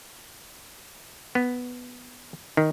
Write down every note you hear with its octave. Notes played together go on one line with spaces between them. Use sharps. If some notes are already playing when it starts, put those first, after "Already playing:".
B3
D#3